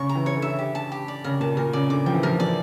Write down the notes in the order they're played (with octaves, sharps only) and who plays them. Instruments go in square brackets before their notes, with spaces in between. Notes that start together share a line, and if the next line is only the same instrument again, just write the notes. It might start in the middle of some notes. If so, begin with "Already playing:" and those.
Already playing: [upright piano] C#3 [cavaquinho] C#6
[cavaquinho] A#5
[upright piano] E3
[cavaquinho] C#5
[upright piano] D3
[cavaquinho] E5
G4
A5
G4
D5
[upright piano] C#3 [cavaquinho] A#4
[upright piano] A#2 [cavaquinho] A5
[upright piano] A#2 [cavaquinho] A#4
[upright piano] C#3 [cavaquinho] D5
[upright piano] D3 [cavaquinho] D6
[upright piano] F3 [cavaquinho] G5
[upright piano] E3
[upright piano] F3 [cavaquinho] A#4
[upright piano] E3 [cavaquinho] D5